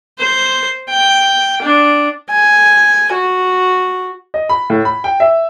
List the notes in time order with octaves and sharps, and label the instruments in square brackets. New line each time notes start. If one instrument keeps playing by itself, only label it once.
[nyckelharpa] C5
G5
D4
[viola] G#5
F#4
[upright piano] D#5
B5
A2
B5
G5
E5